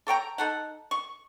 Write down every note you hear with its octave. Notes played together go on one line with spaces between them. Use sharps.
A4 C#5 G5 A#5
D#4 A4 F#5
C#6